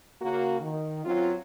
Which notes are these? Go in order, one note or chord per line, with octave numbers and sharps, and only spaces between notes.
C#3 A#3 F#4
D#3
F#2 F#3 C4 F4